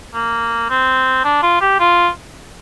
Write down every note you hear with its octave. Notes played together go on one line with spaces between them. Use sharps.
A#3
C4
D4
F4
G4
F4